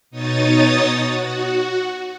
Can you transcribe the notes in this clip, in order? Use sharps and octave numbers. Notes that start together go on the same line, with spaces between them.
B2 D#4 C#5 D#6 A6
F#4